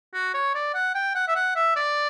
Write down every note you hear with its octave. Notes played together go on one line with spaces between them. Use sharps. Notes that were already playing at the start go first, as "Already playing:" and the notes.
F#4
C#5
D5
F#5
G5
F#5
E5
F#5
E5
D5